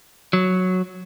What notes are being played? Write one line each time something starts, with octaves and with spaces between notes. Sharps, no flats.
F#3